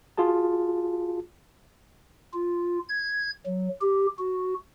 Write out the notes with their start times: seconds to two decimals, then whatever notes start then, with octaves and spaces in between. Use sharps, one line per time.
0.18 F4 F#4 G#4 A5
2.33 F4
2.88 G#6
3.46 F#3
3.81 G4
4.18 F#4